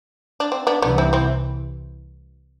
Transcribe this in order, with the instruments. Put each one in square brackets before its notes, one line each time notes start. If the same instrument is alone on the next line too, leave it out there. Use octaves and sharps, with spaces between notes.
[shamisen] D4
C4
B3 D4
[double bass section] C2 C3 E3 [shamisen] B3 D4
[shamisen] C4 E4
C4 E4